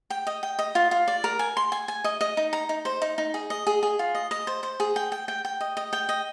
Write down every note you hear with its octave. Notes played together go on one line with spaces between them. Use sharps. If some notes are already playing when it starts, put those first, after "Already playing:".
G5
D#5
G5
D#5
F4
F4
D5
A#4
G#5
C6
G#5
G#5
D#5
D#5
D#4
A#5
D#4
C5
D#4
D#4
G#4
D#5
G#4
G#4
F4
D#5
D#5
C5
C5
G#4
G5
G5
G5
G5
D#5
D#5
G5
D#5